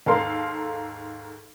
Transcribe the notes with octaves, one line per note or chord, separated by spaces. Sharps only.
D#2 G#2 A4 A#4 F5 C6